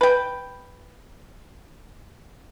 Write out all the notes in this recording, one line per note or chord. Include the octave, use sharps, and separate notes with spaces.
B4 G5